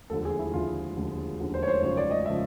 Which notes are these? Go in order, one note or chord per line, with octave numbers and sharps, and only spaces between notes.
E1 D#2 D3 F3 A4
G#4
E4
E1 D#2 D3 F3 F4
E1 D#2 D3 F3
E1 D#2 D3 F3
C5
C#5
C5
G#1 F#2 C#3 F3 C#5
D5
D#5
C#3 F3 E5